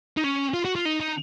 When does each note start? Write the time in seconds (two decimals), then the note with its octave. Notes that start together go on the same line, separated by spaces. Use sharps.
0.17 D#4
0.24 C#4
0.54 F4
0.65 F#4
0.75 F4
0.85 D#4
1.00 D#4